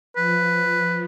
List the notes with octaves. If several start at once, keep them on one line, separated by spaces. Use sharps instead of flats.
F3 B4
F3